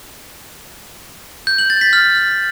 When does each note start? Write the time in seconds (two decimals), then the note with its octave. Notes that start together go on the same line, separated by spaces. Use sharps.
1.47 G6
1.58 F#7
1.70 A6
1.81 B6
1.93 F6